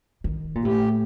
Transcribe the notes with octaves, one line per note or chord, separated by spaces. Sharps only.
D#3
A#2
A2 G4